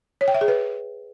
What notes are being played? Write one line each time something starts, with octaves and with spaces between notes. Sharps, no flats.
C#5
G5
E5
G#4
B4